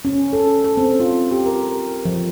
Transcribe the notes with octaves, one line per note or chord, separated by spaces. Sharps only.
C#4
A4
A4
C4
F4
G4
A#4
F3